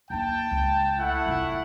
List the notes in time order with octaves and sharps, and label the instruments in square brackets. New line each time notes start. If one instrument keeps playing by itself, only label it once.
[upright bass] D#2 D#4 [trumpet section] G5 A5
[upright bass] C#2
[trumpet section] A3 E4 F#5
[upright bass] F1 F4